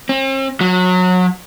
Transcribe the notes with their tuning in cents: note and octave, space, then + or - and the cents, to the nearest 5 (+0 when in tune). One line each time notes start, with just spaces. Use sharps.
C4 +45
F#3 -25